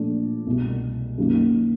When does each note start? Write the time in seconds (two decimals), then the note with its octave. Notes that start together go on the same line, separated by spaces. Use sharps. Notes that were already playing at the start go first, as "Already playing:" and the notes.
Already playing: A#2 F3 A3 D4
0.46 C2 B2 G3
1.18 F#2 D#3 F#3 A#3